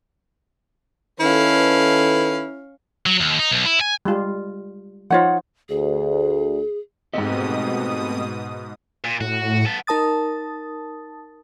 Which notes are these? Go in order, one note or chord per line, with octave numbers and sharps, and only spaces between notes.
D#3 C#4 E4 A4 B4 F5
F#3
D#2
D#4
B1
E4
G#5
G3 G#3 F4
F3 D#4 F4 C5 C#5 F#5
D2 G#4
G#2 B2 A3 C4 G4 D#5 D#6
A#2
A2 F#4
B3 A4
D#4 A#4 A5 D#6 A6